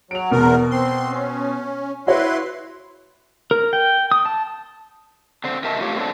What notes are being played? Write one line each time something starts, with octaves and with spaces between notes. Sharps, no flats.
F#3 D7 F7
E2 B2 A#4
C4 C6
C#4
E4 F#4 B4 C#5 C6
A#4
G5
D#6
A5
D3 C4
C3 A#4 D#5 E5 A5
A3 F4 G4 C#5
C4 D4 A4